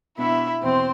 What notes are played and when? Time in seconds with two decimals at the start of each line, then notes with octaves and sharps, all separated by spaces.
0.18 B2 B3 D4 E4 E5
0.63 E2 B2 C4 C5